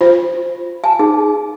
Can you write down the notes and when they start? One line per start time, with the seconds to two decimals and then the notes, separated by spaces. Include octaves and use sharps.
0.01 F4 C5
0.84 G#5 A5
0.99 D#4 G#4